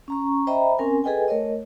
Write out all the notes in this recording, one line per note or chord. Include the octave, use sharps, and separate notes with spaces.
C#4 A#5 C#6
C5 D#5 E5 G5 A#5 B5
C4 C#4 A#4 G#5
G#4 A4 B4 D#5 G5 G#5
A3 A#4 C#5 D#5